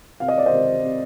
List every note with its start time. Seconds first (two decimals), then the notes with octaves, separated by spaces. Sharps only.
0.20 C3 F5
0.28 D#5
0.38 D5
0.46 C5 D#5
0.52 C3
0.83 C3